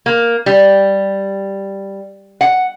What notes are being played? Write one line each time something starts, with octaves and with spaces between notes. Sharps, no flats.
A#3
G3
F#5